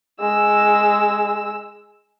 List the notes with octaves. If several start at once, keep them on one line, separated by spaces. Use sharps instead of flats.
G#3 E6